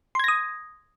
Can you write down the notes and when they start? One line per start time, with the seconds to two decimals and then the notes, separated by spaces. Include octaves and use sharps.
0.15 C6
0.20 G#6
0.24 A#6
0.28 D#6